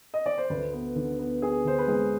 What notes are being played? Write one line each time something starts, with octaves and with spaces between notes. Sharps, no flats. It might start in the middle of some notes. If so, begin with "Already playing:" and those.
D#5
D5
C5
D2 B4
B3
D3
B3
B3 G#4
D3 C5
B4
G#3 G#4